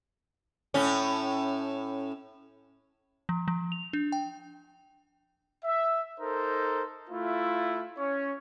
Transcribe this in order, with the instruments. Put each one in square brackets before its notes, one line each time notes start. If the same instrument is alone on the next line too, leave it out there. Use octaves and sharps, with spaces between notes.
[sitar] A2 C#4
[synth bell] F3
F3
F7
D4
G5
[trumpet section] E5
D#4 A4 A#4 C5
A3 E4 F4
C#4 C#5